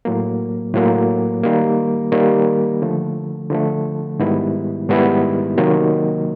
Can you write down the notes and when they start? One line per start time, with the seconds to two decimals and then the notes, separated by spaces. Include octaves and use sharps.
0.05 A2 F#3 A#3
0.74 A2 F#3 A#3
1.43 D#3 G3 A#3
2.12 D#3 G3 A#3
2.82 D3 F3 A3
3.50 D3 F3 A3
4.19 G#2 D#3 G3 B3 E4
4.89 G#2 D#3 G3 B3 E4
5.57 C3 D#3 F#3 A#3